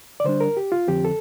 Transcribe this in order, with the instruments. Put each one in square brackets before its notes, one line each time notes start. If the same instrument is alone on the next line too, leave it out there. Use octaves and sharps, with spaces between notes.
[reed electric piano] D5
D3 G3 D4 C5
A#4
G4
F4
F2 D3 F3 C4 G4
A4